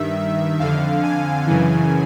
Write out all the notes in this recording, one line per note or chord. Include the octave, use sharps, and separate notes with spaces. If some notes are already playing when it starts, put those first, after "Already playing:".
Already playing: G2 D#3 E5
F2 D3 F5
G#5
F#2 C#3 E3